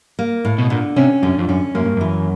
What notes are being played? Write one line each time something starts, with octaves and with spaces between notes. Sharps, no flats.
A#3
A2
B2
A#2 D3
C3 C#4
F#2 D3
F2
F#2 C#4
F#2 A#3
G2
F#2 E3